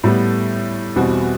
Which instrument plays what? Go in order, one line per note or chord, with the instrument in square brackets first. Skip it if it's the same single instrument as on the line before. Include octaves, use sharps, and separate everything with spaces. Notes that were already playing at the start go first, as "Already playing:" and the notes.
[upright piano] A2 G3 B3
E2 B2 G3 C4 F#4